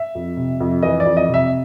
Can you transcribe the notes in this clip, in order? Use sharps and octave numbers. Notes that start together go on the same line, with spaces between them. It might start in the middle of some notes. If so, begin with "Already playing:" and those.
Already playing: E5
F2
C3
F2
E3 D#5
D5
F2
D#5
C3
E5